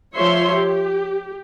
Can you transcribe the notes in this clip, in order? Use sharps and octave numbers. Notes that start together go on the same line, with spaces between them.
F3 F4 C#5 E5 C6
G4